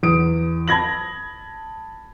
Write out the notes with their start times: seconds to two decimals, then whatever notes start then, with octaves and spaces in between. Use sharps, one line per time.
0.03 E2 D#6 D7
0.68 A5 B5 G#6 A#6 F#7